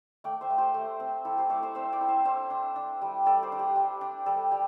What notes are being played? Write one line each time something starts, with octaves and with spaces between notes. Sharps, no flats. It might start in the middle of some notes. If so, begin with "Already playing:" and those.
A3 D5 G5
C5 E5
A3
G4 C5
A3
C4
E4 A4
G4 C5
A3 A4 D5
C5 E5
C4 C5 E5
D5 G5
E4
C5 E5
D4 C5 E5
D4
D4
G3
G3 A4 D5
G4 C5
D4
G4
G3
D4
G3 A4
G3